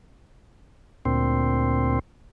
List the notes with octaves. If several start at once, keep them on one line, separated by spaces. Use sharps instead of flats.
D2 A#2 C4